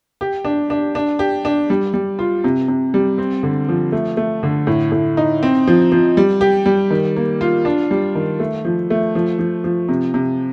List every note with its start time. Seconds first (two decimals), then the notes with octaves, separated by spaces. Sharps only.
0.21 G4
0.45 D4
0.70 D4
0.95 D4
1.19 G4
1.45 D4
1.70 G3
1.94 G3
2.19 F4
2.44 C3
2.68 C3
2.94 G3
3.18 C4
3.43 D3
3.69 F3
3.92 A3
4.17 A3
4.43 D3
4.67 A2
4.92 A2
5.17 D#4
5.43 C4
5.67 F3
5.92 F3
6.17 G3
6.41 G4
6.66 G3
6.90 D#3
7.17 A#3
7.41 F4
7.65 D4
7.91 G3
8.15 D#3
8.40 A3
8.65 F3
8.90 A3
9.15 F3
9.39 F3
9.64 F3
9.89 C3
10.14 C3